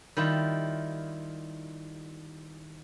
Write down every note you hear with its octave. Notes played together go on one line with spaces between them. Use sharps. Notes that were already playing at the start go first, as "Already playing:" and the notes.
D#3 G3 E4 F4